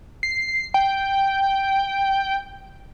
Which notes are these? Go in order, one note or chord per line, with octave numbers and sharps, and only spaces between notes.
C7
G5